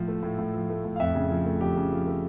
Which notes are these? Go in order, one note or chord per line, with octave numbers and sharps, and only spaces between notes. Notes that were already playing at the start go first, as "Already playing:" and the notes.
Already playing: A2 F3
A3
A2
A2
F3
A3
A2
F5
F2 E5
C#3
F3
A3
F2 G4
C#3
F3
A3